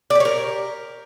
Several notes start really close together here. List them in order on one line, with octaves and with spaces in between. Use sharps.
D5 G4 C#5 A#4